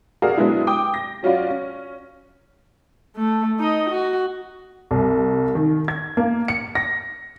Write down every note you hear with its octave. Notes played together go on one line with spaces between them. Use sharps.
F#4 G#4 A#4 D5 F5
F#3 G#3 B3 D4 E4
G5 D6 D#6
A#6
F#3 C#4 F4 F#4 D5
C#4
A3
D#4 D#5
F#4
C2
D#3
G#6
A#3
C#7
A#6